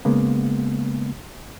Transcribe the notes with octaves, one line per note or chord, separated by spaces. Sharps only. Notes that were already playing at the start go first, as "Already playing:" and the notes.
C#3 G#3 A#3 B3